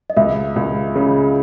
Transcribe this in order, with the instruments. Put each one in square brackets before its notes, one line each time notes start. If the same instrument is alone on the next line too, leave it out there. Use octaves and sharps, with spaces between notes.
[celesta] D#5
[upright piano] C#2 [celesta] E5
[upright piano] C#2
C#3